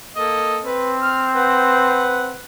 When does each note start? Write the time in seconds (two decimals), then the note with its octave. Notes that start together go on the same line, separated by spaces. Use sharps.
0.16 A#3 A4 D#5
0.64 C4 B4
1.02 F6
1.35 B4 F#5